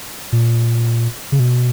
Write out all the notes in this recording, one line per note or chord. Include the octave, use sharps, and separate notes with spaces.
A#2
C#3
B2